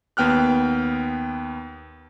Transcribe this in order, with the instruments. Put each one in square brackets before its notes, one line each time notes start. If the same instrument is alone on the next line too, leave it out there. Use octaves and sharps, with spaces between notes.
[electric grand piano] D#2 B3 G5 F6 F#6